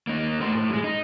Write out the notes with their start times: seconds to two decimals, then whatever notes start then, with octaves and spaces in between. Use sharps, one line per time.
0.07 A#3 D#4
0.41 A3 C5
0.55 A2
0.70 F#3 G#3
0.84 D#4